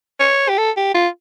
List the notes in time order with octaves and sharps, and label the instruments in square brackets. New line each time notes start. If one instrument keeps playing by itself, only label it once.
[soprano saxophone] C#5
G4
A4
G4
F4